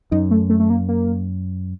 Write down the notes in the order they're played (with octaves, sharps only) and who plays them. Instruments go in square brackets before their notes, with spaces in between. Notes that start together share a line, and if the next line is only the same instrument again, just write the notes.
[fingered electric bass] F#2 [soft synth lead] D#4
[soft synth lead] A3
A3
A3
A#3
A#3